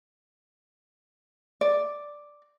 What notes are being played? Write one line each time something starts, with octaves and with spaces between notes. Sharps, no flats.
D5